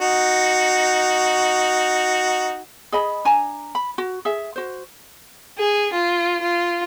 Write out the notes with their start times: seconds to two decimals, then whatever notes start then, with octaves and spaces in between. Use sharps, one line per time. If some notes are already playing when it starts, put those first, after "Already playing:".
0.01 D#4 F#4
2.92 G#4 D#5 B5
3.25 D4 G#5 A#5
3.75 B5
3.98 F#4
4.25 G#4 E5
4.56 F#4 C5
5.57 G#4
5.92 F4
6.40 F4